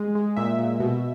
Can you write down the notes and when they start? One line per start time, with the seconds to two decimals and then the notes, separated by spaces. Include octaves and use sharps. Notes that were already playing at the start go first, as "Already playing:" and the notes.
Already playing: G#3
0.15 G#3
0.36 A#2 E5
0.58 A#2
0.80 B2